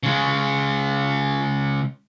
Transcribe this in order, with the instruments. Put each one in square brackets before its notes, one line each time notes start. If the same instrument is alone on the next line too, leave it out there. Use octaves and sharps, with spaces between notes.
[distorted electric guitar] C#3 G#3